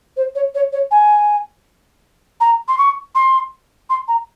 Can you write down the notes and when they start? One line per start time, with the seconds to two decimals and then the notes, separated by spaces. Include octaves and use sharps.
0.17 C5
0.35 C#5
0.55 C#5
0.72 C#5
0.91 G#5
2.40 A#5
2.68 C6
2.78 C#6
3.15 C6
3.90 C6
4.08 A#5